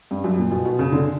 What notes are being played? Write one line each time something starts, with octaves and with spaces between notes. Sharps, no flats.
G2
F#2
A#2
B2
B2
C#3
D3